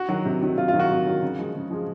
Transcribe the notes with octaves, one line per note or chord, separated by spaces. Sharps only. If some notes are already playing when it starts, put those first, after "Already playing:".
Already playing: F#4
D#3 F#3
C3
D#3 F#3
C3 F4
F4
D#3 F#3
F#4
C3
D#3 F#3
C#3
F3 G#3
C#3
F3 G#3